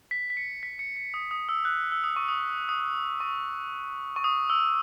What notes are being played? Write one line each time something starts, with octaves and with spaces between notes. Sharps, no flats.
B6
B6
C#7
B6
C#7
C#7
D#6
D#6
E6
F#6
E6
D#6
C#6
D#6
D#6
C#6
C#6
D#6
E6